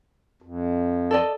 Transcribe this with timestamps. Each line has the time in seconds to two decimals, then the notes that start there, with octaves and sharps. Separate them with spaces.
0.42 F2
1.11 A4 D5 D#5